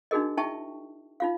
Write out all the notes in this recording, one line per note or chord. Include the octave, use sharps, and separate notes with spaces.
D4 D#4 F#4 G#4 A#4 D#5
D#4 E4 E5 G5 A5 C#6
D#4 F4 F5